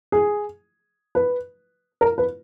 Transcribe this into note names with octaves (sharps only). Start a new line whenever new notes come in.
G#4
B4
A#4
B4